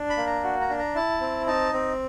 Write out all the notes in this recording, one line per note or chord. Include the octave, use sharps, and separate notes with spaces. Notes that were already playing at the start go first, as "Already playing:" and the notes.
Already playing: D4
B5
A#3
A#5
F#4
A#5
D4
A#5
E4 A5
C4
D#4 A5
C4